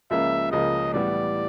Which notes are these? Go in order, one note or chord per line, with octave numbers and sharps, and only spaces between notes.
C#2 C#3 F3 A#3 E5
C#2 C#3 F3 A#3 D#5
A2 E3 G3 B3 D5